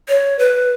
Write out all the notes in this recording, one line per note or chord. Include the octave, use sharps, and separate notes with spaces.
C#5
B4